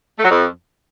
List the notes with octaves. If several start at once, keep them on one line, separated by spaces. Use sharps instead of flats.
A3
F#3
F2